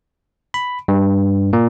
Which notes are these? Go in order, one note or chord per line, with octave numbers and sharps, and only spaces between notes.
B5
G2
A#2